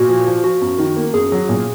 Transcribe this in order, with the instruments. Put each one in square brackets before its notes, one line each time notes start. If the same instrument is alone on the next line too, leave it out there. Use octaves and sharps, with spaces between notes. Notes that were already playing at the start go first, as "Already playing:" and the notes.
Already playing: [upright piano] A#2 [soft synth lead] F#4
[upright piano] F3
F3
[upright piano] F3 [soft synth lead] F#4
[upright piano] F#2
D#3
A#3
[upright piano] F#2 [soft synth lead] G#4
[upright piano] F#3
A#2